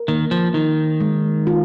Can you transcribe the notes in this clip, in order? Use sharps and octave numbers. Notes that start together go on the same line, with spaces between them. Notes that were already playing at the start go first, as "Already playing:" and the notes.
Already playing: A#4
D#3 A#3
F3
D#3 D#4
G#3
F4